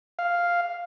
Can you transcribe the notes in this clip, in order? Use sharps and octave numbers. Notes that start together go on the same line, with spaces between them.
F5